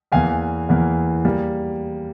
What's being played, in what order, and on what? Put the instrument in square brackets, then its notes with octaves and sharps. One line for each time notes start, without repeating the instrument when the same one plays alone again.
[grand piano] E2 E3 A#3 F5 G#5
E2 E3 A#3
G3 A#3